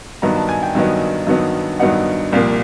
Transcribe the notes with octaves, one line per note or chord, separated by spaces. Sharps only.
G2 D#3 F#3 B3 D#4 A#5
A5
G#5
G5
G2 D#3 F#3 B3 D#4
G2 D#3 F#3 B3 D#4
G2 D#3 F#3 B3 D#4 F#5
C2 A#2 F3 A#3